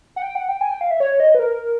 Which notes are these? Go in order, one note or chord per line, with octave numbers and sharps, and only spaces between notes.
F#5
G5
F#5
G5
G#5
G5
F5
E5
C#5
D#5
B4
A#4